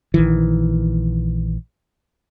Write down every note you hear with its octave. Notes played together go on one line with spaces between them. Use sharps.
A#1 D#3 E3